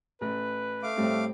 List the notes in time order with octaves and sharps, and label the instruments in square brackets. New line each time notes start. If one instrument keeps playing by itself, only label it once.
[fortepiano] A1 [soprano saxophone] B4
[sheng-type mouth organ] A3 F5 D6
[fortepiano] A2 G3 C4